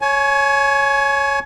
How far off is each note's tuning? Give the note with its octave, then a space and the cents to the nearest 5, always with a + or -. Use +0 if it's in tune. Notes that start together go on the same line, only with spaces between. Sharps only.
C#5 +0 G#5 +30